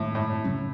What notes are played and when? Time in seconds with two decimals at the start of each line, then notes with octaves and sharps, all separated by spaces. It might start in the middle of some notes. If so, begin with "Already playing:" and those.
Already playing: A2 D#3 G#3
0.15 A2
0.44 C#3 F#3 C#4